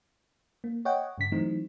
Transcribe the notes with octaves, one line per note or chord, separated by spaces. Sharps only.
A#3
C#5 D#5 F#5 G5
G2 C#3 B6
E3 F#3 A3 C4 D#4